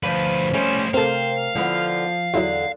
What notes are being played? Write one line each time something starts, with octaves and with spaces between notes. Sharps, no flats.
D2 F3 B4
G3 A3 C#4 C5
C3 C4 A4 A#4 C5 F5
D3 F3 B3 E4
E2 D3 F#3 E4 F4